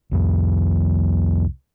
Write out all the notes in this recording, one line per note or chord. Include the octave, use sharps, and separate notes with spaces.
C2 F2